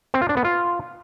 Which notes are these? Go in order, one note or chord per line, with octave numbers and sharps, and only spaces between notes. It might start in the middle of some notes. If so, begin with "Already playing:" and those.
C4
F4
D4
B3
F4